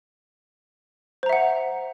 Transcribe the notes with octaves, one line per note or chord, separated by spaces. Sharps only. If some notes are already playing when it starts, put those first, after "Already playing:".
C5 E5 F#5 A#5